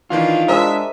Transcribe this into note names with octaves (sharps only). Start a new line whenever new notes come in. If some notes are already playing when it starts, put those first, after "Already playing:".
D#3 E3 D4 F4
G#3 D4 A#4 C5 E5 A#5 D#6 E6